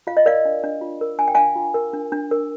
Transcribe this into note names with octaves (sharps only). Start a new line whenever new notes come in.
F4 F5
D#5
A#4 D5 F5
D4
D4
F4
A#4
D4 G#5
G5
D4 F5 G#5
F4
A#4
D4
D4
A#4